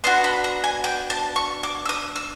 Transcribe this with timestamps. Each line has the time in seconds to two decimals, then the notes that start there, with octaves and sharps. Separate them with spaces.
0.04 B3 D4 F#4 C6
0.24 B5
0.44 A#5
0.64 G#5
0.84 G5
1.10 A5
1.36 C#6
1.63 D6
1.85 E6
1.89 D#6
2.16 E6